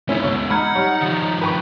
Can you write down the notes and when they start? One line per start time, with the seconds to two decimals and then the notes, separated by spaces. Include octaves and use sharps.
0.09 G#3 B3 C#4 E4
0.21 D2 C#5 E6
0.50 D#4 F#5 B5 F6 G#6
0.75 G3 C#5
1.01 D#3 F3
1.41 B4 G5 C#6